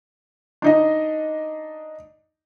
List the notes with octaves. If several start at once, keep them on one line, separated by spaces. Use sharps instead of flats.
D4 D#4 D#5